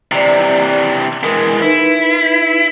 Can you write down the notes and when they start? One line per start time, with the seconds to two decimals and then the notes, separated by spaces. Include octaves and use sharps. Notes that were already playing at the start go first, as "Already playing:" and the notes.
0.12 C3 E3 D5 A#5
1.23 E3 G#3 A#4
1.62 D#4 E4 B4